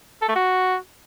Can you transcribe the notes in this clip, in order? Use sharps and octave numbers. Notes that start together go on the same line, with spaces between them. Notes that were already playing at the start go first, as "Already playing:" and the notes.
A4
A3
F#4